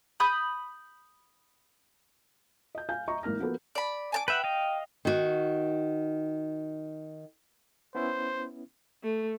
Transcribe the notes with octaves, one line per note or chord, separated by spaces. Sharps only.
B5 D#6 G6
D#5 G6
F5 G#5 G6
D#5 E5 A#5 C#6
G#1 E3 A#3 F6 A#6
F3 A#3 B3 F#4 A4 B4
D5 B5
G#5 A5 D6
B4 E5 F#5 G5
D#5 F5
D#3 F#4
B3 C#4 E4 C5
A3